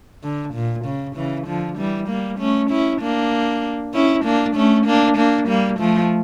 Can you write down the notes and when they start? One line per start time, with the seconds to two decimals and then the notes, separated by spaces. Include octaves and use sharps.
0.23 D3
0.54 A#2
0.85 C#3
1.16 C#3 E3
1.47 D3 F3
1.78 E3 G3
2.09 G3 A#3
2.39 A3 C#4
2.70 C#4 E4
3.01 A#3 D4
3.94 C#4 E4
4.25 A#3 D4
4.56 A3 C#4
4.86 A#3 D4
5.17 A#3 D4
5.48 G3 A#3
5.79 F3 A3